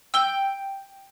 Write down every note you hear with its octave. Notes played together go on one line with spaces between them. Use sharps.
G5 E6 G7